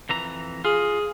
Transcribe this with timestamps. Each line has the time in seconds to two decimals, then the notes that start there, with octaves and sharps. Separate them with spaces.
0.09 F2 E3 A#5
0.65 F4 G#4